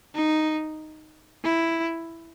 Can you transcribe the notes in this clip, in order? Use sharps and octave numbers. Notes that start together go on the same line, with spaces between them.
D#4
E4